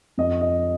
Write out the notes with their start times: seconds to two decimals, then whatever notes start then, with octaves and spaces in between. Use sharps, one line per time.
0.18 F2 D#5
0.41 D#5